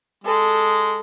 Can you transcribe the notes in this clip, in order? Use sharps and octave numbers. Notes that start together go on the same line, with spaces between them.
G#3 A4